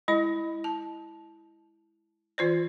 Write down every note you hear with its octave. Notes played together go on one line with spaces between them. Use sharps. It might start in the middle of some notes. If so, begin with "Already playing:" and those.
G#3 E4 D#5
A5
E3 F4 C5 D5